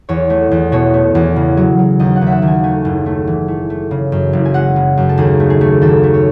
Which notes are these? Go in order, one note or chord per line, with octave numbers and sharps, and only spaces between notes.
E2 C#5
A3
E2
B2 C#5
A3
E2
C#3
F#3
F#3
D#2 D#5
F#5
D#2
E5 F#5
D#2
G#5
A3 G#5
F#1
A3
E3
A3
A3
C#3
F#2
F#1
G#5
G#3 F#5
C#3
F#2
A4
D#2 G#4
A3
G#4
A3
D#2 A4
A3
C#5